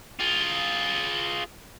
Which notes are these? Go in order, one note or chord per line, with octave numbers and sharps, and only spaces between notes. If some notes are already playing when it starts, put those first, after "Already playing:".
F4 G#4